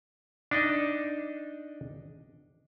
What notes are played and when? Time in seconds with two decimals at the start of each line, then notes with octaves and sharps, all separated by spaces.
0.51 D4 D#4 D#5